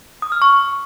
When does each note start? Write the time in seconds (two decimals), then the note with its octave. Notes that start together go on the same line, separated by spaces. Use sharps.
0.22 D#6
0.32 F6
0.42 C#6